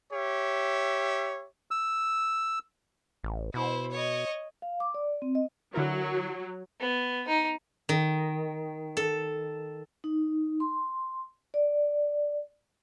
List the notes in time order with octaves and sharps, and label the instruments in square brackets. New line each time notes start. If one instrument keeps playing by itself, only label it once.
[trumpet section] G4 C#5 E5
[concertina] E6
[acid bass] A1
[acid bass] B2 [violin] E4 C5
[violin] C#5 D#5
[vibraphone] F5
D6
D5
C4
D#5
[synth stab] D3 E4 A#4 [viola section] F#3
[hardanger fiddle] B3
D#4
[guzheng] D#3
A4
[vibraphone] D#4
C6
D5